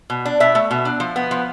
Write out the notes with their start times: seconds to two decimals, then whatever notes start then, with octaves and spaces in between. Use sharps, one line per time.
0.10 B2
0.25 D4
0.40 B2 E5
0.55 A3
0.71 B2
0.85 D4
1.00 F3
1.16 B3
1.31 F3